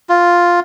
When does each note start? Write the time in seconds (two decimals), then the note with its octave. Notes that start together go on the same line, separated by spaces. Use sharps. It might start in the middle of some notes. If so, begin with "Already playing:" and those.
0.09 F4